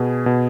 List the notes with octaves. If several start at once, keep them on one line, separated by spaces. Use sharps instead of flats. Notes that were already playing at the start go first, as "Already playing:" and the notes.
Already playing: B2 B3 G#4
B2